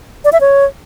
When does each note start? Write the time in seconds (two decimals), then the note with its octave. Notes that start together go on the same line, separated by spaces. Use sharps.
0.25 D5
0.33 E5
0.41 C#5